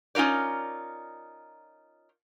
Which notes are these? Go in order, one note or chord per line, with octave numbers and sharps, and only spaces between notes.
C#4 D#4 F4 A#4 D5